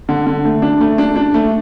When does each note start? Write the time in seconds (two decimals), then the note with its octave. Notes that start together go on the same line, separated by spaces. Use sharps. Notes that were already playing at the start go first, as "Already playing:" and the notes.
0.09 D3
0.26 D3
0.45 A3
0.62 D4
0.81 A3
0.98 D4
1.16 D4
1.34 A3